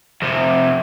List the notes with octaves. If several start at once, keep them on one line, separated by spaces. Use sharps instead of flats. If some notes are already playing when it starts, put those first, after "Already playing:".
F2 C3